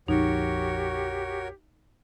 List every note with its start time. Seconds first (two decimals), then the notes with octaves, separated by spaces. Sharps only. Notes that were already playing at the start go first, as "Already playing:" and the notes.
0.08 A#1 F2 D#4 F#4 G4 A#4 C#5